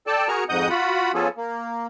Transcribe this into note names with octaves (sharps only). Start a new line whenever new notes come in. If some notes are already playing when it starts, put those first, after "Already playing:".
A4 D5 G5 A5
F#4 G#4 A#4 A#5 C#6 F6
F2 G#2 D#5 F#5 D#6 G6
F4 F#4 F#5 B5
F3 B3 C#4 F4 G#4 A4
A#3